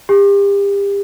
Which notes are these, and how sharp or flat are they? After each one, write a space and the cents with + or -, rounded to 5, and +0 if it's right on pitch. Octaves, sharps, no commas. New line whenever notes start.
G4 +35